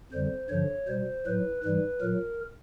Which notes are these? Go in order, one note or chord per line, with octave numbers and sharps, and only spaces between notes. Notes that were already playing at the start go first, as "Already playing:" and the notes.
F2 D3 G3 C5
G2 D3 F3 C#5
B2 G3 C5
A2 F#3 B4
G#2 E3 G3 B4
A#2 F#3 A#4